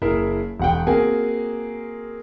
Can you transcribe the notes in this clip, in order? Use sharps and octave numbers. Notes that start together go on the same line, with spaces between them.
F#1 E4 G#4 A#4 E5
E1 F#5 G5
A#3 C4 F#4 G#4 G#5